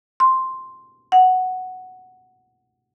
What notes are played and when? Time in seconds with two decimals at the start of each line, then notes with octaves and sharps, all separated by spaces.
0.20 C6
1.12 F#5